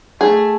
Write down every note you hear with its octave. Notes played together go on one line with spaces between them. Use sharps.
A3 G#4